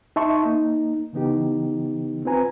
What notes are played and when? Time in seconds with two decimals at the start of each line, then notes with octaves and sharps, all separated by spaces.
0.16 D#4 E5 A5 C6 C#6
0.43 A#3 D#4
1.13 C#3 E3 B3 D#4 G4
2.25 C4 F4 B4 G#5 A#5